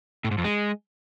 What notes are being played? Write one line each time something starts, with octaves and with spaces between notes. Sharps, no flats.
A2
G#2
F2
G#3